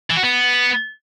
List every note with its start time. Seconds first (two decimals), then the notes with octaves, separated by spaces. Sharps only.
0.10 E3
0.17 F#4
0.23 B3